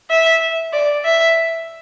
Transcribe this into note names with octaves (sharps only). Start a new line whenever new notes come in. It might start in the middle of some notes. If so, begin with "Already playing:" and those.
E5
D5
E5